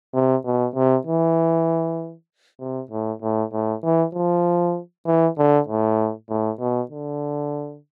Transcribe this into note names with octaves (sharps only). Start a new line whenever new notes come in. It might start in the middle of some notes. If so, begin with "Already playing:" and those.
C3
B2
C3
E3
C3
A2
A2
A2
E3
F3
E3
D3
A2
A2
B2
D3